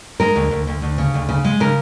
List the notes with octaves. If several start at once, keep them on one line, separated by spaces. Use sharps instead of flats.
G#3 A#4
D2
D2
D2
D2
C#3
D2
C#3
G#3
C#3 A#4